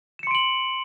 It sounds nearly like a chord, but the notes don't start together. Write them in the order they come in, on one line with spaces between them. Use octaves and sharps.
E7 C#7 C6 D7 F#7